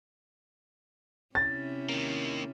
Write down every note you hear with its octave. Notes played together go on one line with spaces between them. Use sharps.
C3 C#4 E4 A6
D#3 A#3